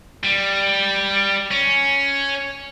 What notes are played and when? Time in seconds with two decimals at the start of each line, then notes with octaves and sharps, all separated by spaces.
0.23 G3
1.51 C#4